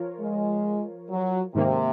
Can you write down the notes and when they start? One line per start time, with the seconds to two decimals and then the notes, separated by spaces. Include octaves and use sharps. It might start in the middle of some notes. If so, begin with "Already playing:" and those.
Already playing: F3 F4 A#4 C#5
0.20 G#3
1.10 F#3
1.55 G#2 C3 D#3 A#3